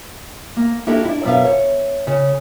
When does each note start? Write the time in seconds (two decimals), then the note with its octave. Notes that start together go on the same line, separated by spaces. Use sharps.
0.57 A#3
0.87 A#3 D4 E4 F#4 G4 A4
1.05 D4 E4
1.24 F#2 B2 C#4 D4 E5 F5
1.45 C#5
2.07 C#3